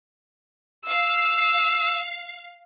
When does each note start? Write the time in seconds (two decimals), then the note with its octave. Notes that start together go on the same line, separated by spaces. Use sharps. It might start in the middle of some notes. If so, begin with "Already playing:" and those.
0.87 F5 E6